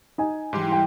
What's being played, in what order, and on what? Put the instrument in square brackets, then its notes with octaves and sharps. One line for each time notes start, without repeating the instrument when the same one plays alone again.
[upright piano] D#4 G#5
[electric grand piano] G#2 G4 C6 [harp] E3 G3
[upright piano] G5